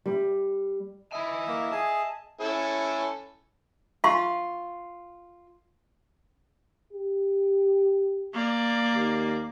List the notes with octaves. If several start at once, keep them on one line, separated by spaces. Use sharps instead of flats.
G3
E4 D#5 E5 G#5
A#3
G#4 G#5 A5
C#4 E4 A4
F4 F5 C6 C#6
G4
A#3 D5
D#2